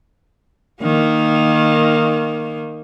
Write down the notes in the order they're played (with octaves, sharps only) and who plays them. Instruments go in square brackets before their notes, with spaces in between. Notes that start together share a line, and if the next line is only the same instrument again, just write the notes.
[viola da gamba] D#3 A#3